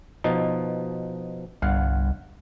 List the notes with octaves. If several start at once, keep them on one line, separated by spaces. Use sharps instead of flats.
B2 F3 D#4
G1 C2 F5 F#5